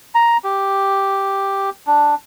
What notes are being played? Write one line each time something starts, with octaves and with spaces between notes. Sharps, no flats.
A#5
G4
D4